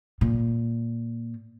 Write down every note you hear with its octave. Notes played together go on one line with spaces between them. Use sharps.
A#2